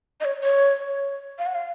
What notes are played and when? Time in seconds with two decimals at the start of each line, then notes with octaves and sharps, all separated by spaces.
0.20 D#5
0.25 C#5
0.43 C#5
1.39 F5
1.46 F#5
1.55 F5